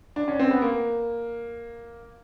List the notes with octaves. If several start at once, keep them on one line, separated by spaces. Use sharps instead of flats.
D4
C#4
C4
B3
A#3